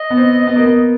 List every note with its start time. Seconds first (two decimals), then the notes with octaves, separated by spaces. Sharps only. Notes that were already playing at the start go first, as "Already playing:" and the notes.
Already playing: D#5
0.10 B3
0.17 C4
0.47 B3
0.56 A#3
0.66 B3